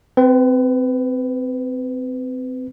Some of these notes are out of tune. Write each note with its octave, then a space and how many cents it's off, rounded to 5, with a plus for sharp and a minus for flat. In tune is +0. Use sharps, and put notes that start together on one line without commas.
C4 -20 B4 +20